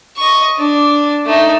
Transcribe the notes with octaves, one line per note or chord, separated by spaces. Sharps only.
D#5 C#6
D4
A3 D#4